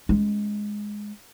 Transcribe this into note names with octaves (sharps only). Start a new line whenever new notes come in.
G#3 C#4